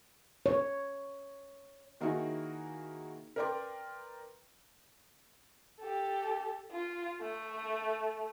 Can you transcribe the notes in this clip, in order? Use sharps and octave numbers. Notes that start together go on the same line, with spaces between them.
C#5
D#3 A#3 D#4 E4 F#4 G#4
A#4 B4 D5 G5 C6 D6
G4 A4
F4
A3